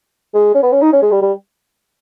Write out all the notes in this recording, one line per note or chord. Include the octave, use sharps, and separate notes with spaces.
G#3
C#4
B3
C#4
D#4
C#4
G#3
G3
G3